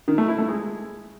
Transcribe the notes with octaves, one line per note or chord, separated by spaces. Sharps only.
D#3
A3
E4
A3
G#3